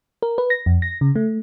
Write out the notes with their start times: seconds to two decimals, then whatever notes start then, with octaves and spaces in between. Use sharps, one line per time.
0.22 A#4
0.38 B4
0.50 A#6
0.66 F2
0.82 A#6
1.01 C#3
1.16 A3